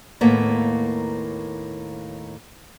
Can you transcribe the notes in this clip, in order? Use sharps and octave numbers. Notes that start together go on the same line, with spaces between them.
D#2 A2 A#3 B3 B4